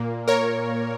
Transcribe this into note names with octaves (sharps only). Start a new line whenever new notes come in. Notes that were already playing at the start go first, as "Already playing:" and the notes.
Already playing: A#2 A#3
A#4 C#5